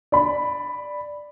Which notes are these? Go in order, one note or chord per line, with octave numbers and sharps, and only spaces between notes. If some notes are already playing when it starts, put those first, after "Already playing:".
D5 B5